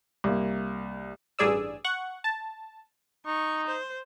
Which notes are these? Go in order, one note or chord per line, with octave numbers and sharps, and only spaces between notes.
C2 A#3
A1 G2 G#4 D5 E6
F#5 C#6
A5
D#4 C#6
C5